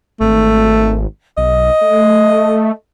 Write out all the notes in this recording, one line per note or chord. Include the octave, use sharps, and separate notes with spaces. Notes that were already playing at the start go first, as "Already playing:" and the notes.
G#1 A3
B1 D#5
A3